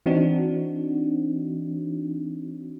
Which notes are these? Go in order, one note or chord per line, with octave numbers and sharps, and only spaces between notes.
E3 C4 D4 D#4 F#4